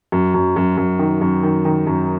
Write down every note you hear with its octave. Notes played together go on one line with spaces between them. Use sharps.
F#2
F#2
F#2
F#2
D#3
F#2
D#3
D#3
F#2